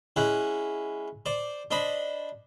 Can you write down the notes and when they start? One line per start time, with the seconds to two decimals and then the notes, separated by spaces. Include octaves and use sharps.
0.16 G#3 C#4 E4 F#5
1.26 C5 D5
1.71 D4 C5 D#5 B5